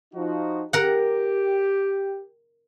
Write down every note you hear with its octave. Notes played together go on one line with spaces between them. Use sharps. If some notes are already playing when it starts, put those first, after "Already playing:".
F3 D#4 F#4
G4 A#4 F#5